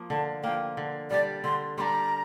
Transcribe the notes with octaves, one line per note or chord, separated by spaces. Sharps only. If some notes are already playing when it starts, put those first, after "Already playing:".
Already playing: F3 A#3
D3 A5
F3 A#3 G5
D3
G3 D4 G4 D5
D3 C6
G3 D4 G4 A#5 C6